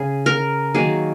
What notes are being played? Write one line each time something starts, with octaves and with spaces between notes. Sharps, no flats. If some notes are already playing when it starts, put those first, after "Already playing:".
Already playing: C#3 G#4
A#4
D#3 F#3 A#3 G#4